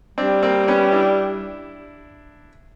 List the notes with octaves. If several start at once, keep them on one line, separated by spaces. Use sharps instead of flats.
G3 C4 D4
A#3 C4
B3 C#4
D4 E4